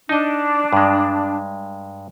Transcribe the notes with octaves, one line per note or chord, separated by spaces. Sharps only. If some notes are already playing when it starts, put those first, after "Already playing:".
D4 D#4 D#5
G2 G#3